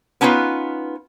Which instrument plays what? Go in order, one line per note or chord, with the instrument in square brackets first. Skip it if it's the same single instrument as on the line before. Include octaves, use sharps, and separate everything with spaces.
[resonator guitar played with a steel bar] B3 C#4 D#4 F4 B4